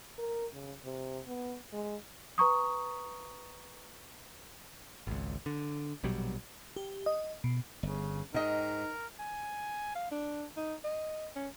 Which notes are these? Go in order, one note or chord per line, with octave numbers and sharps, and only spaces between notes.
A#4
C#3
C3
B3
G#3
B4 A#5 C#6 D#6
G#1 C#2
D3
A#1 B2 F#3 G3
G4
D#5
B2
G1 C#3
G#2 D#4 A#4 D#5 G5
G#5
F5
D4
D#4
D#5
C#4